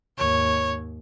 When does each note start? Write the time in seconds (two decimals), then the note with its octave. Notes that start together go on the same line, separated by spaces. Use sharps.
0.18 D#2 G#2 C#5